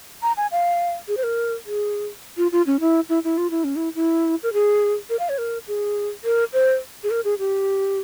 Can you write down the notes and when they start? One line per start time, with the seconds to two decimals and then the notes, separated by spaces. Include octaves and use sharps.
0.23 A#5
0.37 G#5
0.52 F5
1.08 G#4
1.17 C5
1.23 A#4
1.66 G#4
2.37 F4
2.52 F4
2.67 C#4
2.80 E4
3.09 E4
3.24 E4
3.38 F4
3.51 E4
3.64 C#4
3.76 E4
3.95 E4
4.43 A#4
4.53 G#4
5.10 A#4
5.19 F5
5.29 C#5
5.38 A#4
5.68 G#4
6.24 A#4
6.53 C5
7.04 G#4
7.11 A#4
7.25 G#4
7.39 G4